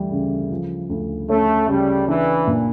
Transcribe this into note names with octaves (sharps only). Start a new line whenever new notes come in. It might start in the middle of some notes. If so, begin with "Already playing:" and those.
Already playing: D2 E3 G3
C#3
F3
D2
A3 C#4
C#3 G3
E3 D4
A#2